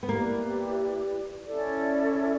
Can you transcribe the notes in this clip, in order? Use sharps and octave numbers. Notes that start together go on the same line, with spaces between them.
B3
A#3 E4 G4 B4 D5
C#4 E4 A4 D5